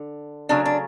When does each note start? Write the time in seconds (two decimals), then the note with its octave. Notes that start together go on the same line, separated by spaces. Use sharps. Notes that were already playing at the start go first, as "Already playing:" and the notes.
Already playing: D3
0.49 C#3 F#3 A3 D4
0.66 D4